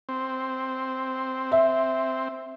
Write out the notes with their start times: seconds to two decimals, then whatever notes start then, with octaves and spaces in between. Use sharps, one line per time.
0.09 C4
1.52 E5